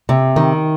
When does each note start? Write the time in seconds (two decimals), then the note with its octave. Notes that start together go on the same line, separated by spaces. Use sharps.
0.09 C3
0.36 D#3